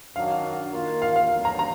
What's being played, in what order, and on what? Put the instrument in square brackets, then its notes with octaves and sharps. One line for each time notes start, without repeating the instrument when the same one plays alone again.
[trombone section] F#2 D#3 F#3 D4 F#4 [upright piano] F5
[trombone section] D#3 A#3 F4 A#4
[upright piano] F5
F5
[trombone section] D2 D3 F#3 B3
[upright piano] A#5
A#5